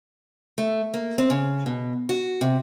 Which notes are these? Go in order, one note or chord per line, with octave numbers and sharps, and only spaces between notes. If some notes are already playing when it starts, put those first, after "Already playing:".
A3
A#3
C4
C#3
B2
F#4
C3